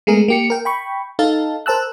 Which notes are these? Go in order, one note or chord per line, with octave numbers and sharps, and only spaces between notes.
G#3 A3 B3 G#4 A#4
A#3 G4 C#7
A#4 G5
G5 B5 C#6
D#4 A4 F5 A5
A#4 C5 A5 E6 F#6